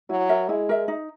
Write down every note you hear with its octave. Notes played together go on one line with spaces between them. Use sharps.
F#3 E4
A#4 E5
G#3 E4
A#4 E5
D#4